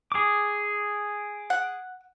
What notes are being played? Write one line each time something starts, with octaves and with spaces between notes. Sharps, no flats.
G#4 D6
F#5